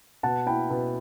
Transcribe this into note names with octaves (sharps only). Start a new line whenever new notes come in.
B2 F#5 A5
E4 G5 B5
B2